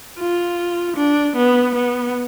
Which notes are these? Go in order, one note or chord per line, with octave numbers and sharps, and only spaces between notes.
F4
D4
B3
B3